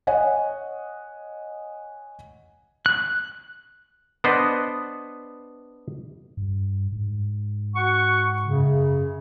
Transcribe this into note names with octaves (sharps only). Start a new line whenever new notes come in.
C#5 D#5 F#5 G#5
F#6
B3 D4 B4 C5 D#5
G2
G#2
F#4 F#5 C#6
F#2 C#3